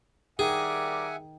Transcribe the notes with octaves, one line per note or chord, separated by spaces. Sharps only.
D#3 G3 G#4 A#4 E5 F#5 G#5 D6